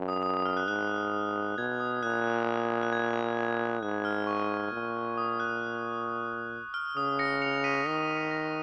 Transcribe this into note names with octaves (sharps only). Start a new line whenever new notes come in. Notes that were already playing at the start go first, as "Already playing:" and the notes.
Already playing: F#2
D#6
D#6
D#6
F6
F#6
G#2 F#6
B2 G#6
D#6
A#2 F#6
F#6
G#6
G#2 F#6
F6
C#6
A#2
D#6
F#6
F6
C#3 D#6
A#6 C#7
C#7 F7
B6 D#7
D#3 A#6 C#7
A#6 C#7
A#6